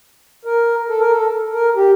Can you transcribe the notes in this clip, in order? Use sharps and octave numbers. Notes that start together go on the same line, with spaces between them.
A#4
A4
A#4
A4
A#4
G4